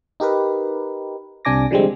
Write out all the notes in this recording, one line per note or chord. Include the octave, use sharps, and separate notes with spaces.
D#4 G4 A#4 B4
C2 C3 D4 G#5 D6 A#6
D3 F3 G3 G#3 C4